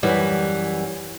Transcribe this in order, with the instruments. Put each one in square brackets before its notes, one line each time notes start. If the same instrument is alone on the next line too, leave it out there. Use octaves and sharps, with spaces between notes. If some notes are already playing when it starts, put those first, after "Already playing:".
[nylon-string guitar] F#2 E3 G3